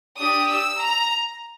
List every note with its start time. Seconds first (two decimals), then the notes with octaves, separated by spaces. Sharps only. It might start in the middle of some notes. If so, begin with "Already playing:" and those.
0.19 D4 G4 D#6
0.51 E6
0.81 A#5